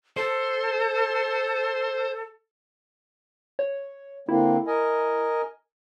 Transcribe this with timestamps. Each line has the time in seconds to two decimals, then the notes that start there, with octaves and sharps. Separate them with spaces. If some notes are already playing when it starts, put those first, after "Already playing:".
0.17 A4 C5
3.59 C#5
4.29 D3 A#3 C4 E4
4.67 A#4 D#5 G#5